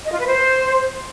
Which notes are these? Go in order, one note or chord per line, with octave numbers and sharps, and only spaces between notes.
D#5
F4
B4
C5